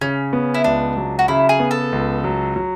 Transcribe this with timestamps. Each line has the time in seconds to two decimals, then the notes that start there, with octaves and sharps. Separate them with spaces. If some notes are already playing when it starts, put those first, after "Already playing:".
0.01 C#3 C#4
0.33 B3
0.54 E4
0.64 C#2 D4
0.97 F#3
1.19 F#4
1.28 C#3 E4
1.49 G#4
1.60 B3
1.71 A4
1.92 C#2
2.24 F#3
2.56 F#3